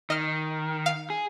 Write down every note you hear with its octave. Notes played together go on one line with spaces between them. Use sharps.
D#3 D#5 F6
F5
G#4